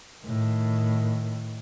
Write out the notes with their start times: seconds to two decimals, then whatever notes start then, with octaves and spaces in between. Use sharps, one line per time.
0.23 A2 D#3